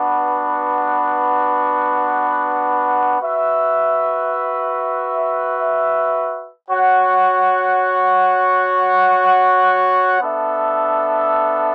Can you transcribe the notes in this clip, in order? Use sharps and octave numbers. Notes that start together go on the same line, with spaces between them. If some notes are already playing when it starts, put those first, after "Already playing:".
Already playing: B3 D4 F#4 B4 F#5
F#4 B4 E5
F#4 C#5 F#5
B3 D4 A4 E5